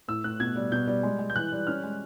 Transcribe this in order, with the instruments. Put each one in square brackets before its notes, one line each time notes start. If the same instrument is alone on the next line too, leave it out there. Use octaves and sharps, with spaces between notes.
[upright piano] A2 E6
A2 F#6
B2 G#6
G3
B2 G6
G3
G#3
G#3
G6
E3 F#6
G3
C#4 F6
G#3